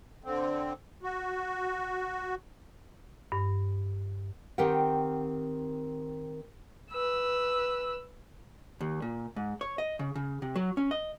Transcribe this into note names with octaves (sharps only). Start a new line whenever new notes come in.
D3 C4
F#4
G2
D#3 C4 G4 A#4 F#5 G5
B4 E6
D#2
A#2
G#2
C#5
D#5
C#3
C#3
C3
F#3
C#4
D#5